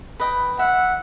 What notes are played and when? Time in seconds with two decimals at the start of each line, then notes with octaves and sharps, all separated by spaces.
0.20 B4 D#5 G5
0.59 E5 F#5